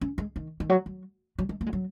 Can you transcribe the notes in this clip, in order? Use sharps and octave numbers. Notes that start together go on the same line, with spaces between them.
C#4
G#3
D#3
D#3
F#3
F#3
F#3
G#3
A#3
G#3
F#3